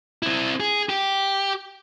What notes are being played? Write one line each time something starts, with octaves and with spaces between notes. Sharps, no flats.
C4 E4
G#4
G4